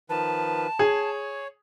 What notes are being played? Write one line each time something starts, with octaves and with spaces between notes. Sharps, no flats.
D#3 F3 B4 A5
G#4 C#5